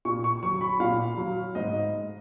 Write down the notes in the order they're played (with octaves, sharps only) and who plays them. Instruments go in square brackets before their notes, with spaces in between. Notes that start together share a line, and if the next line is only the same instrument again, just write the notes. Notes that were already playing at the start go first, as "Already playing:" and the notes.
[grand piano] A#2 C#6
C#6
F#3 C#6
B5
A#2 F5
F#3
G#2 D#5